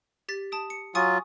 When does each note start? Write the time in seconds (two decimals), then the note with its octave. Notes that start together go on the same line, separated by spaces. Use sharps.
0.29 G4 A6 B6
0.52 A5 D#6 D7
0.70 C#7
0.95 F#3 F4 G#5 C#6 D#6